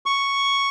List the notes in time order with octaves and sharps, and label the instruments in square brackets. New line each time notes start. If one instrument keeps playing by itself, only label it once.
[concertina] C#6